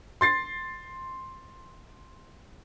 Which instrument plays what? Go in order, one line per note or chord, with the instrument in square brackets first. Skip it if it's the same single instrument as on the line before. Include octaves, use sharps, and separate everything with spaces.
[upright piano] C6 A6 C7